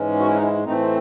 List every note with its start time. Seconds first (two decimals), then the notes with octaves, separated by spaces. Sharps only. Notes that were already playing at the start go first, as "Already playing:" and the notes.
Already playing: G#2 E3 G#3 C#4
0.19 F#4
0.27 E4
0.35 D#4
0.42 C#4 E4
0.64 A2 E3 A3 C4 D#4